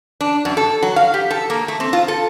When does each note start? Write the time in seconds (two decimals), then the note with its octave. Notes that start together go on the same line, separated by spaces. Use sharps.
0.21 D4
0.45 F#2
0.57 A4
0.83 F#3
0.96 F5
1.14 G4
1.30 A4
1.50 A#3
1.68 A3
1.80 C4
1.93 F4
2.08 A4